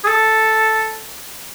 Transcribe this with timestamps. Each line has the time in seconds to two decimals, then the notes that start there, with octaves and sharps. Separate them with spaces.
0.04 G#4
0.08 A4